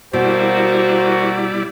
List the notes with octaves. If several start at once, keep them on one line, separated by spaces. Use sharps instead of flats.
B2 G3 A#3 E4 F#4 C5 D5